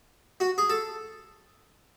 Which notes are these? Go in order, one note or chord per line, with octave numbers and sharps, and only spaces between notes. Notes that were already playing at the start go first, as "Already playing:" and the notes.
F#4
G#4
A4